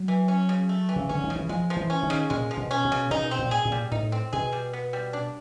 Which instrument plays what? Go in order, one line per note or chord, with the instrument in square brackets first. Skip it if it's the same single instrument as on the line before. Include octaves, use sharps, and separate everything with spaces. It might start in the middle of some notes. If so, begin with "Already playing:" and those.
Already playing: [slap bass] F#3
[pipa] E3
C#4
C#3
A3
E3
[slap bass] C#3
[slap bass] D3 [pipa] C#4
[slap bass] D#3
[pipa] C#3
[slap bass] E3
[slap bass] F3 [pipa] G#3
[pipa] F3
[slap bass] E3
[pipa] C#4
[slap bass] D#3
[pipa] C#3
[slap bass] A#2 [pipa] G#3
[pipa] F3
[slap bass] B2
[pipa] C#4
[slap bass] B2
[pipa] C#3
[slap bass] B2 [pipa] D#4
[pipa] C4
[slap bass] A#2
[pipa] G#4
[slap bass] A#2
[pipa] G3
[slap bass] A2 [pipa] D#4
[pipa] C4
[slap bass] B2 [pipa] G#4
[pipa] G3
B3
G3
D4